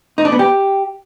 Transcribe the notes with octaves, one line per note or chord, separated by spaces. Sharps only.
D#4
D4
B3
G4